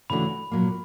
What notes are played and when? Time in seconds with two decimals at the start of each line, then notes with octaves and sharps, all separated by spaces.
0.10 C#3 E3 A3 D4 F#4 B5
0.51 A#2 F#3 A#3